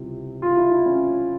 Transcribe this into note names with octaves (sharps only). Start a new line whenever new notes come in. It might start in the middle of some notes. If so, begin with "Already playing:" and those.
Already playing: C#2 C3 E3 G3
F4
E4
E4
C#4